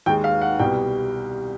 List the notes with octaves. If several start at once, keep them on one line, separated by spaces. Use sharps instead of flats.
D#2 D#3 G#3 G5
F5
F#5
C2 B2 G3 G5